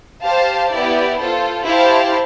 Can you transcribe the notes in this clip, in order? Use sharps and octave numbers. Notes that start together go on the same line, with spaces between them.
G4 C5 F5 A5
B3 E4 G4 D5
F4 A4 C5
E4 G4 C5 F5 A5